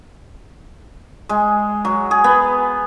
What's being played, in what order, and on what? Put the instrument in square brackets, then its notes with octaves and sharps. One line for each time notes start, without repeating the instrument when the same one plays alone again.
[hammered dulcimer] G#3
F#3
G#4
B3